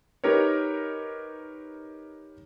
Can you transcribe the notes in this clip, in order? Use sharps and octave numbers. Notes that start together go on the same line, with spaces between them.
D#4 G4 A#4 B4 C#5